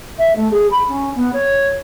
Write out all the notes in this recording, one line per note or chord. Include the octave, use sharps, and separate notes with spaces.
E5
A3
G#4
B5
C#4
B3
C#5